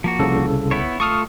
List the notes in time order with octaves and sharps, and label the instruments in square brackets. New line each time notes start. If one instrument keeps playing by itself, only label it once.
[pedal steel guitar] F3 A#3 F#4
[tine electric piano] C2 C#3 A4
[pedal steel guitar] B3 E4 C#5
[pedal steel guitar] A3 F4 A4 [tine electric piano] C#6 D#6 F6